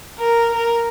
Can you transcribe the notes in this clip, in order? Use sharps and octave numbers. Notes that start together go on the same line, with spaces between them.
A#4
A#4